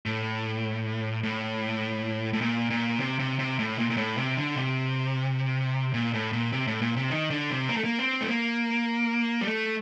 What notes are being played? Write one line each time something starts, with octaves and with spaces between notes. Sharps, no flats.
A2
A2
A2
A#2
A#2
C3
C3
C3
A2
A#2
A#2
A2
C3
D3
C3
A#2
A2
A#2
C3
A2
A#2
C3
D#3
D3
C3
A#3
A3
A#3
C4
A3
A#3
G3
A3